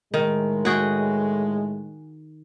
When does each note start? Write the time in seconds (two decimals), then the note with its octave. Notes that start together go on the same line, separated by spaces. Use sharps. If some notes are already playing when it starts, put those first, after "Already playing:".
0.14 A2 D#3 G#3
0.65 F#4 G#4 G5